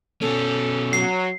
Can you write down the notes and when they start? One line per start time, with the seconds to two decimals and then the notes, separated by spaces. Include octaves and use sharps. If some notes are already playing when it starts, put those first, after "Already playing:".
0.21 B2 C#4 A4
0.93 F#3 C7